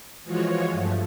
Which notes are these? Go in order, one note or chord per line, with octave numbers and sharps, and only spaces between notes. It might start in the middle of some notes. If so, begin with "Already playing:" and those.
E3 F3 G#3 F4 F#4 C#5
G2 F3 A3